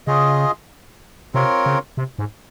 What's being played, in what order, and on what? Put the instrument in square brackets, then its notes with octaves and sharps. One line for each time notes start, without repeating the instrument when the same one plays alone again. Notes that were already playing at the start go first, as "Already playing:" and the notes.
[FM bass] C#3 [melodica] F4 G#4 D#5
[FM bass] C3 [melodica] C4 F4 A#4 C#5
[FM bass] C#3
C3
G#2